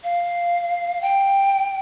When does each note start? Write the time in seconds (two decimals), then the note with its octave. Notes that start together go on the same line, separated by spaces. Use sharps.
0.04 F5
1.02 G5